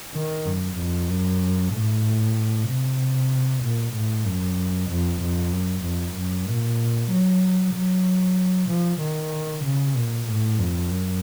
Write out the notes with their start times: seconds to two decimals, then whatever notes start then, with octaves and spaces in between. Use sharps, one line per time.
0.15 D#3
0.46 F#2
0.78 F2
1.10 F#2
1.73 A2
2.68 C3
3.63 A#2
3.94 A2
4.26 F#2
4.90 F2
5.21 F2
5.52 F#2
5.84 F2
6.17 F#2
6.48 A#2
7.11 F#3
7.74 F#3
8.69 F3
9.01 D#3
9.64 C#3
9.96 A#2
10.28 A2
10.59 F2
10.91 F#2